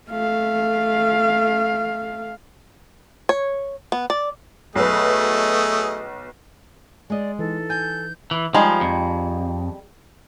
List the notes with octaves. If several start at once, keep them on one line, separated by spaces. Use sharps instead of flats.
A3 F5
C#5
B3
D5
B1 A3 G#4 B4 D#5
G#3 D5 D#5
E3 D#4 A4
G#5 G6
E3
F3 G3 G#3 D#4
F2